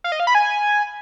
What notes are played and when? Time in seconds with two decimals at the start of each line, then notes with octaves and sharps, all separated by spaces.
0.04 F5
0.12 D#5
0.20 F5
0.27 B5
0.35 G#5